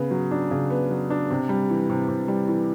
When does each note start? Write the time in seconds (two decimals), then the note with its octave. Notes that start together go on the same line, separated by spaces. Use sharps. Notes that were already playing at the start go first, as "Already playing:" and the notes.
Already playing: C#3 B3
0.11 F#3
0.31 D4
0.51 C#3
0.70 B3
0.90 F#3
1.10 D4
1.30 C3
1.49 G3
1.70 E3
1.90 C3
2.08 C3
2.28 G3
2.48 E3